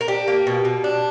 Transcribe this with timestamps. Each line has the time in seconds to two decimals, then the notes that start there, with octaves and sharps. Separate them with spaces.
0.01 A#4
0.08 D4 G4
0.28 A#3
0.47 B2
0.65 B2
0.84 D4